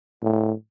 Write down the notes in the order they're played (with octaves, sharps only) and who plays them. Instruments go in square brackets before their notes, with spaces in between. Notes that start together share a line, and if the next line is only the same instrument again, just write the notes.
[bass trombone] A2